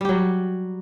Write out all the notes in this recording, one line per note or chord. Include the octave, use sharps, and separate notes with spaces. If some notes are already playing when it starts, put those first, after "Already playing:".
F#3 G3 G4